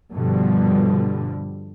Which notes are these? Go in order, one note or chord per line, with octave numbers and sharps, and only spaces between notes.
G2 B2 D3 F3 G3